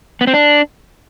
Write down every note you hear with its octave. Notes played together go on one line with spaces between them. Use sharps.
B3
C4
D4